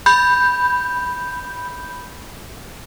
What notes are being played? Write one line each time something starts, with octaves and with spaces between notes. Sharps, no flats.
B5 G6